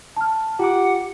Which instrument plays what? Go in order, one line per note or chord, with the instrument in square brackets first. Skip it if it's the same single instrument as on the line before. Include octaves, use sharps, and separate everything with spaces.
[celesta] A5 F6
[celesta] F4 [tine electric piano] G4 D6 [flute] F#5